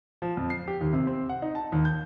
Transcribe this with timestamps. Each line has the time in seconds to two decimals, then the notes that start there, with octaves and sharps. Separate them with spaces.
0.22 F3
0.37 F2
0.50 C7
0.68 G4
0.81 D#2
0.93 C3
1.07 C4
1.29 F#5
1.42 D#4
1.55 A5
1.72 D#2
1.85 G6